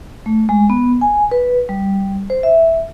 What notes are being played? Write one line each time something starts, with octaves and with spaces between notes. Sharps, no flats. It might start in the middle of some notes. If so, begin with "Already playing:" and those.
A3
G#3
B3
G#5
B4
G3
C5
E5